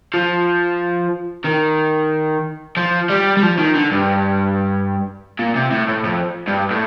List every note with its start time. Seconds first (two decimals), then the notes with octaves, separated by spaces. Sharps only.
0.14 F3
1.45 D#3
2.77 F3
3.10 G3
3.37 G3
3.43 F3
3.58 D#3
3.75 D3
3.92 G2
5.39 A#2
5.55 C3
5.71 A2
5.89 A2
6.05 F2
6.48 G2
6.71 A2